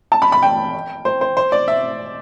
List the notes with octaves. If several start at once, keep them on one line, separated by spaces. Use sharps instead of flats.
A5
B5
B5
G5
C5
C5
C5
D5
E5